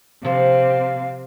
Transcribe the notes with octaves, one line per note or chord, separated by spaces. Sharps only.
C3 F3 A4 C5 F5